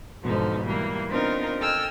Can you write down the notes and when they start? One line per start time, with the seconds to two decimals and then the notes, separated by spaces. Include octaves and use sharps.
0.22 E2 G#2 B2 D3 F3 D#4
0.64 E3 G3 A#3
1.08 B3 C4 D4 D#4 F4 A#4
1.59 A4 D#5 G5 G#5 E6 F6